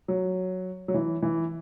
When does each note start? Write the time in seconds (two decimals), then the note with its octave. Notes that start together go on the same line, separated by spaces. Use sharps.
0.08 F#3
0.88 F#3
0.94 E3
1.22 E3